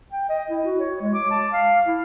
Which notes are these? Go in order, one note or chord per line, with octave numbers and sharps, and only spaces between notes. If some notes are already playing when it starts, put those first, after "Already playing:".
G5
D#5
E4
F#4
C#5
G#3
D6
A5
F5
E4